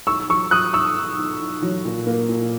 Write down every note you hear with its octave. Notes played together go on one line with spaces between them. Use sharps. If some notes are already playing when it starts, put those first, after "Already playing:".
B1 C#6 E6
F#3 C#6 E6
F#3 D#6 F#6
B1 C#6 E6
B1
B1
B1
F#3
A#2
A#3
A#2